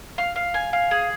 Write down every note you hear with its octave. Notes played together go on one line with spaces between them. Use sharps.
F5
F5
G#5
F5
G#4